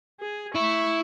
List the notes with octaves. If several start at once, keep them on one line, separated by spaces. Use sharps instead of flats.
G#4
A3 E4 C#6